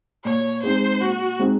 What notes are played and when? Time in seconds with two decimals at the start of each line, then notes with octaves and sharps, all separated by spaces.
0.25 A#2 C#5
0.63 G#3 C4 D#4 G#4 C5
1.00 A#2 F#4
1.39 G#3 C4 D#4 G#4